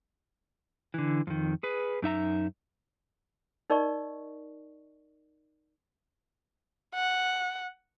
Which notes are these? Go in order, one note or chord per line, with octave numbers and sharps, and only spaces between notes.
D3 E3
F2 D#3
G#4 B4
F#2 D#4 E5 A#5
D#4 A#4 D5 D#5 C#6
F#5